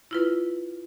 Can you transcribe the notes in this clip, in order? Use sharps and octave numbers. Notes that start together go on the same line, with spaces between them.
E4 F4 B4